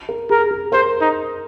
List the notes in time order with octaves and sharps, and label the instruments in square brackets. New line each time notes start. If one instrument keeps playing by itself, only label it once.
[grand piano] A#4
[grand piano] G#4 [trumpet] A#4
[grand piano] G#4
[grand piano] A#4 [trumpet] C5
[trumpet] D#4